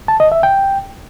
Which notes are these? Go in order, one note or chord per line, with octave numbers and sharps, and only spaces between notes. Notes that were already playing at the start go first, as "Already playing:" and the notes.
A5
D#5
E5
G5